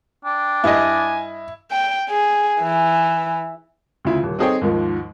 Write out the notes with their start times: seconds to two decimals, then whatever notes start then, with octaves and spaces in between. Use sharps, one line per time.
0.25 D4 G5
0.64 G2 E4 D#5 G#5
1.72 G5
2.10 G#4
2.61 E3
4.05 D2 C#3 E4 F4
4.23 D#1
4.39 C4 D#4 G#4 A4 C#5 G5
4.61 D#2 G#2 D#3 F3